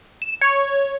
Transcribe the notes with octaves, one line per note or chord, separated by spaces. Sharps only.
E7
C#5